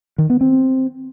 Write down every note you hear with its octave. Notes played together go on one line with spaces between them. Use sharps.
D#3
B3
C4